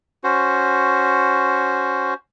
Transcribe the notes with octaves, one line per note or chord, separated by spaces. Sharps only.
C#4 F#4 C5